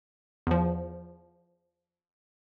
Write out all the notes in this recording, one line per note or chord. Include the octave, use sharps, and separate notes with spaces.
E2 F3